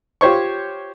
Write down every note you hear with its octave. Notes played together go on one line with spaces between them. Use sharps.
F4 G4 C5 C#5 C#6